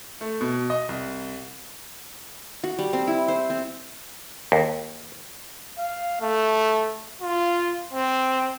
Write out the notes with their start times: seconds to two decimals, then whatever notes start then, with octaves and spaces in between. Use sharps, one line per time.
0.21 A3
0.41 B2
0.70 D#5
0.89 C2
2.64 F#4
2.79 G3
2.93 C4
3.07 E4
3.28 C5
3.50 C4
4.52 D#2
5.78 F5
6.21 A3
7.21 F4
7.93 C4